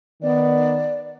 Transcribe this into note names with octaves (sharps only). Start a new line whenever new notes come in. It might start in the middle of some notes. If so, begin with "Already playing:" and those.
D#3 B3 D5